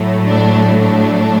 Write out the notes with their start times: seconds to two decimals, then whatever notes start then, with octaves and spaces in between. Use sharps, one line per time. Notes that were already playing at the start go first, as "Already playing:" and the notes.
Already playing: A2 F#3 A3
0.26 D4
0.81 D4